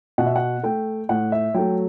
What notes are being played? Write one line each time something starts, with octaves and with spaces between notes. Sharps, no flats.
B2 F#5
E5
F#5
A3 G5
A2 F#5
E5
F#3 A3 G5